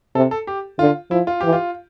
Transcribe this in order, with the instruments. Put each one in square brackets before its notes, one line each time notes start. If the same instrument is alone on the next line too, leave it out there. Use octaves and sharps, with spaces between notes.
[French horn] C3 [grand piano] A4
[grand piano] A4
G4
[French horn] D3 [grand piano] F4
[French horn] F3 [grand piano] E4
[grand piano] F4
[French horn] E3 [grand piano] G4
[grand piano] F4